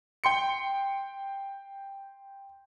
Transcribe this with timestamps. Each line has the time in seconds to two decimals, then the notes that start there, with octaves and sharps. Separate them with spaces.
0.24 G5 C6 C#7